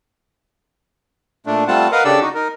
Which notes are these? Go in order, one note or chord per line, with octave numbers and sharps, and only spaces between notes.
A#2 A3 D4
G3 A3 C4 F4 F#5 A5
A#4 B4 D#5 F5 F#5
C#3 D4 G4 A4 D5 E6
D#4 F#4
D#4 A#4